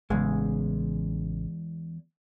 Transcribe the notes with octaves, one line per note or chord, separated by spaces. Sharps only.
A1 E2 C#3 G#3